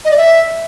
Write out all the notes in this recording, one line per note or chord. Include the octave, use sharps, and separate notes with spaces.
D#5
D5
E5